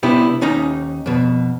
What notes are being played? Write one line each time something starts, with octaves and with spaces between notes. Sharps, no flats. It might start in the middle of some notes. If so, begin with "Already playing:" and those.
C3 B3 D4 E4 G4
D#2 C#4 D#4 A#5
F2 B2